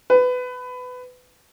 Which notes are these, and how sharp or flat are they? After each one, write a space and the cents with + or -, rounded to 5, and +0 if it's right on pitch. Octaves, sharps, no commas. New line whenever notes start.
B4 +20